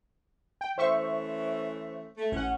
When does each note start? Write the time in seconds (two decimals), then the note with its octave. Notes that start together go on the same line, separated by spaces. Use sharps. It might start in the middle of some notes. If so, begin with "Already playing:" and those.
0.61 G5
0.78 E3 A3 C#4 C5 E5 C#6
2.18 A3
2.32 A1 C#4 F#5